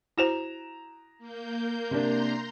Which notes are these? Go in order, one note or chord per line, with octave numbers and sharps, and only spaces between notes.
E4 F#4 C5 A#5 E7 F7
A#3 G6
C3 A#3 D4 A#5 C6 G6